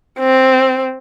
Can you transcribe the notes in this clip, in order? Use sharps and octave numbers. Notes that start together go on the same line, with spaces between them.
C4